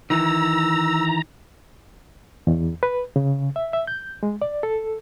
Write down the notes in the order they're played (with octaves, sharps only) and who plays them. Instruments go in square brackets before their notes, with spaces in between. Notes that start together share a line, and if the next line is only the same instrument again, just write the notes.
[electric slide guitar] D#3 E3 [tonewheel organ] A#5 [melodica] E6
[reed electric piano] E2
B4
C#3
E5
E5
G6
G#3
D5
A4